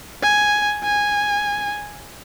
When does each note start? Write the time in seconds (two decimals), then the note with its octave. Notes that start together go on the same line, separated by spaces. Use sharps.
0.23 G#5
0.84 G#5